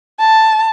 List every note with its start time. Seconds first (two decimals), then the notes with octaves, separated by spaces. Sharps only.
0.20 A5